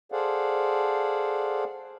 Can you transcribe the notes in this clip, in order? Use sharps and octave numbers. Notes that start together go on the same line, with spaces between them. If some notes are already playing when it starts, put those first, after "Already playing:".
G#4 A4 C5 D5 F5 F#5